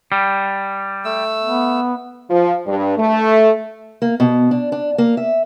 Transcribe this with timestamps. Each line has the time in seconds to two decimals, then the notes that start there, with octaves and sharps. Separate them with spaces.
0.12 G3
1.05 A3 E6
1.43 B3
2.29 F3
2.66 G2
2.97 A3
4.02 A#3
4.20 B2
4.51 D4
4.72 D4
4.98 A#3
5.17 E5